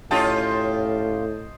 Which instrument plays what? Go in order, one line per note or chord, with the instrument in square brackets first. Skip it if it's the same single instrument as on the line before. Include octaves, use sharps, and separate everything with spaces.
[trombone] A2 [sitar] C#4 F4 G4 [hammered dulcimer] C5 D#5 A5